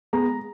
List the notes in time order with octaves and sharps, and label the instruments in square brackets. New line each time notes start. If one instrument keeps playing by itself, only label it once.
[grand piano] G#3 B3 A#5